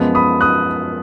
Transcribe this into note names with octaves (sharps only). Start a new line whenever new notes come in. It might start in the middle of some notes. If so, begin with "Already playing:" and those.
Already playing: F#2 F3 G#3 B3
B5 D#6
D#6 F#6